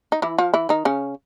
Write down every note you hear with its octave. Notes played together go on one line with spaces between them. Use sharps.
D#4
E3 E4
F3 F4
E3 E4
D#3 D#4
C#3 C#4